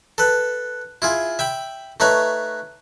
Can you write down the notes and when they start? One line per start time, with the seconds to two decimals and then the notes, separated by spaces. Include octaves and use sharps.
0.18 A4 B4
1.02 E4 F4 G#4
1.39 E5 G5 B5
2.00 A3 D#4 B4 C#5